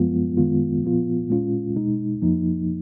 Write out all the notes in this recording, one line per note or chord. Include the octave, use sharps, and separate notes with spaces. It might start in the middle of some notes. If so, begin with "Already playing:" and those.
Already playing: F#2 F3 G#3 B3 F4
F#2 D#3 G#3 B3 F4
A#2 F3 B3 F4
A#2 G#3 C#4 F4
B2 G#3 D#4
F2 F3 A#3 D#4